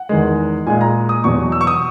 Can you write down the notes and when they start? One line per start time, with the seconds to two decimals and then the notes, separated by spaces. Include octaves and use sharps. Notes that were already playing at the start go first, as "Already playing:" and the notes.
Already playing: F#5
0.09 E2 D#3 G#3
0.66 A#2 G#3 G#5
0.81 A#5
1.09 D#6
1.24 E2 B2 F#3 C#6
1.52 E6
1.61 C#6
1.67 D#6